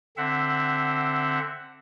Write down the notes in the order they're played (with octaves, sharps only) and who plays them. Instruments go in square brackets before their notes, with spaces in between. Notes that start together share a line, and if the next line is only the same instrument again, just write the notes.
[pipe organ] D3 C4 E5 F#5